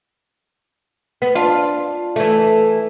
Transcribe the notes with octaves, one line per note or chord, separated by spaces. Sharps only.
B3
D4 F4
E3 A3